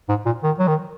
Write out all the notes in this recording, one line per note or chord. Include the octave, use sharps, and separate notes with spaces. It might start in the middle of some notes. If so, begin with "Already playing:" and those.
G#2
A#2
D#3
F#3
D#3